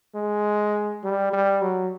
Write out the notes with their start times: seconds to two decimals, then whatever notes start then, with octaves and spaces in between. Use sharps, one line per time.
0.15 G#3
1.04 G3
1.33 G3
1.62 F#3